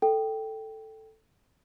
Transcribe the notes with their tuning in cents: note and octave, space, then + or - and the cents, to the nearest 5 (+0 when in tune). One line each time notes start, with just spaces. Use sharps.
A4 +0 G5 -5